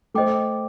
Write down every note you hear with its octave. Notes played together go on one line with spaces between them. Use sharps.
A3 C5 D#5 G5 D6